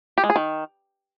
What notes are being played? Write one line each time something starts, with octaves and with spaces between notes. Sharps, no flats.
G4
G#3
G#4
D#3